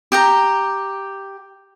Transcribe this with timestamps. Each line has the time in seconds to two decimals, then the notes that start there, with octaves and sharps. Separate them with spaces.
0.12 G4 G5 A#5